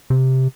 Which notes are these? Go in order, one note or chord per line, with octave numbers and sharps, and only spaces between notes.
C3